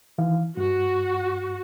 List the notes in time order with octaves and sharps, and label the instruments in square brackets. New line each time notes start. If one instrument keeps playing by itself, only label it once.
[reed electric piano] D#3 E3 F5
[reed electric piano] G2 [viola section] F#4